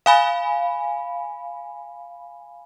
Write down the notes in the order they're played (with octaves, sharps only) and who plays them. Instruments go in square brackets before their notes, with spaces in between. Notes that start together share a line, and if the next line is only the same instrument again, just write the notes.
[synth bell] F5 G#5 B5